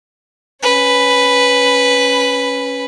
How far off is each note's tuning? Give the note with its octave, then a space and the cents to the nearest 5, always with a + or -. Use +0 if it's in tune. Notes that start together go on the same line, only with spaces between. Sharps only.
C#4 +0 B4 +0